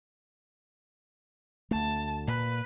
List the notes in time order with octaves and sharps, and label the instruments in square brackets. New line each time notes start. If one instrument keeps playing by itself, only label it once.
[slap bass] D2 A3 [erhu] A5
[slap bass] A#2 [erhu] B4